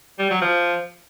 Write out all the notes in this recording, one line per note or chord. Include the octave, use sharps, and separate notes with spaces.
G3
F#3
F3